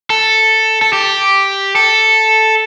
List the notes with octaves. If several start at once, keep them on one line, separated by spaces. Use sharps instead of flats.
A4
A4
G4
A4